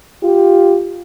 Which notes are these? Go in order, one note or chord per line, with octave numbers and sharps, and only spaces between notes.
F4 G4